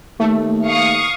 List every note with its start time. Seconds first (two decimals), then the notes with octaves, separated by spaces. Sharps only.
0.20 D#2 A3
0.64 F5 C#6 D#6